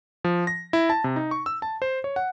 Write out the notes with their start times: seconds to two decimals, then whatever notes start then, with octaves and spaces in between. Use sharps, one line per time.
0.24 F3
0.47 A#6
0.73 E4
0.90 A5
1.04 C3
1.16 D#4
1.31 C#6
1.46 E6
1.62 A5
1.82 C5
2.04 C#5
2.16 F#5